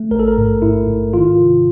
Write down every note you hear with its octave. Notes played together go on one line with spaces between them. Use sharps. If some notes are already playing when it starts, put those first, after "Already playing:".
Already playing: A3
A1 A#4
A4
A#4
G#2
G#2 E4
G#2
D#3 F4
C3